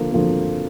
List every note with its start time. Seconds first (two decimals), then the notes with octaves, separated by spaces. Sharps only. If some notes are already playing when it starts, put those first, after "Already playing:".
Already playing: D3 F3 A#3
0.12 D3 F3 A#3